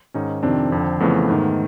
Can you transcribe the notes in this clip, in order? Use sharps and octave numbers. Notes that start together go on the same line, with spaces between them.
G#2 D#3 C#4 D#4
F2 C3 D#3 C4 D4
F2 D3
F2 C#3 E3 A3 B3
G#2 D#3